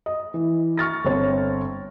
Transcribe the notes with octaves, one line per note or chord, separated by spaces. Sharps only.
D#5
E3
C#6 F6 A6 A#6
G1 C4 C5 C#5